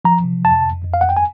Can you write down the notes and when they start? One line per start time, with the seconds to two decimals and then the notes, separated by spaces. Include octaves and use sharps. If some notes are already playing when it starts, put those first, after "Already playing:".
0.05 F3 A#5
0.24 C3
0.44 F2 A5
0.64 F2
0.85 F2
0.94 F5
1.01 F2 F#5
1.09 G5
1.17 G#5